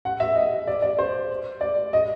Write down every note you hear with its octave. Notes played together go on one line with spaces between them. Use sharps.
F#5
E5
D#5
D5
D5
C5
D5
D#5